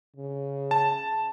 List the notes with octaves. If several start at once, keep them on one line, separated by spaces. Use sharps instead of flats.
C#3
A5